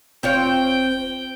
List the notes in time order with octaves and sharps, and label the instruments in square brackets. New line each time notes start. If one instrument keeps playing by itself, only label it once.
[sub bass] D#1 [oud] C4 F4 C#5 [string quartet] G5